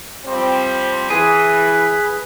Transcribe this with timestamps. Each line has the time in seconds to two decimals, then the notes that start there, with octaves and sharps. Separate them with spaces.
0.25 F3 G3 C4
1.10 E3 G#4 B4 G#5